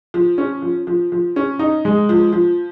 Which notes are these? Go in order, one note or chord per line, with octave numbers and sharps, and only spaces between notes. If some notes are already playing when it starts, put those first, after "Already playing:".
F3
C#4
F3
F3
F3
C#4
D#4
G#3
F3
F3